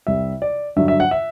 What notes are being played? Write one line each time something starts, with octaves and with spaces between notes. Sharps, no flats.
C2 C3 G3 E5
D5
G2 D3 F#3 E5
E5
F#5
E5